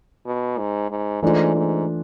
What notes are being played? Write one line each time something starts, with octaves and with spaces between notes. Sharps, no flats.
B2
G#2
G#2
G#2 E3 A3 D4 F4
G#2